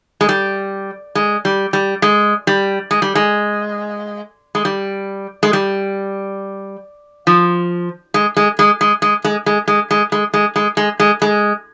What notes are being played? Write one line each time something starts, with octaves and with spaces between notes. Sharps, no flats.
G#3
G3
G#3
G3
G3
G#3
G3
G#3
G3
G#3
G#3
G3
G#3
G3
F3
G#3
G#3
G#3
G#3
G#3
G#3
G#3
G#3
G#3
G#3
G#3
G#3
G#3
G#3
G#3